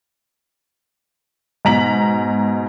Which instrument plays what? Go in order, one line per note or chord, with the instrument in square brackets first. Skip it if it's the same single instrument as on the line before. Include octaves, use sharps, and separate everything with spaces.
[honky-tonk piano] G#2 B2 A#5 B6 F#7